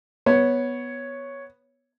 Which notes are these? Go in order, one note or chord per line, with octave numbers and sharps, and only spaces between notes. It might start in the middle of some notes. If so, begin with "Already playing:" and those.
B3 C#5